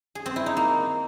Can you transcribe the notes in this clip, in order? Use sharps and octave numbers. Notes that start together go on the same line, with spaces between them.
G#4
C4
E4
D#4
A#3